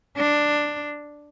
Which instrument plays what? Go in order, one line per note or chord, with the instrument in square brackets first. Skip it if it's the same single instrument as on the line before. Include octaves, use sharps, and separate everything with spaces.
[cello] D4